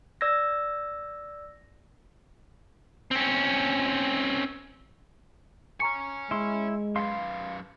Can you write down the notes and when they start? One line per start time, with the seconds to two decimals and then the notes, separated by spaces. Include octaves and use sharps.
0.21 D5 E6 G#6 A#6
3.11 C4 C#4
5.80 C#5 G#5 A#5 C#6 C#7
6.31 G#3 E4 C6
6.96 F#2 B4 F5 C6